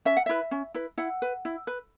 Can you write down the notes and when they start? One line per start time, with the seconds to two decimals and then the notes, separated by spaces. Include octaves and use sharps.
0.05 C#4 E5
0.17 F#5
0.26 E4 B4 E5
0.51 C#4
0.74 E4 B4
0.98 E4 F#5
1.22 B4
1.45 E4
1.67 B4